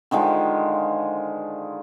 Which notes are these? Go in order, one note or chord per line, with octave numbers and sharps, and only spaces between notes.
D3 D#3 F3 G#3